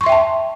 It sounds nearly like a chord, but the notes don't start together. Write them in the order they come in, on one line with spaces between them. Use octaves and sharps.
C#6 C6 E5 G5 A5